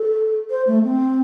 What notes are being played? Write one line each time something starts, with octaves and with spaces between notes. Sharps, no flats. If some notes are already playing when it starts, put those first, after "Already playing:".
Already playing: A4
C5
A3
C4